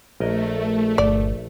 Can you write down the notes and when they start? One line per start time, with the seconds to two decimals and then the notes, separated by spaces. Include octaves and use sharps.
0.20 A#1 A3 A#4 D#5
0.98 G1 D5